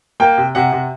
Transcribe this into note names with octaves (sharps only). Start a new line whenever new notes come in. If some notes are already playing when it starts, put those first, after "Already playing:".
A#3 G5
C3
C3 F#5
C3